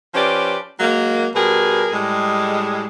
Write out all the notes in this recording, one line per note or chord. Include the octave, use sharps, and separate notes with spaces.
F3 C#4 G4 B4 D5
F#3 G#3 A#3
B2 G3 G#4 A#4
A2 G3 G#3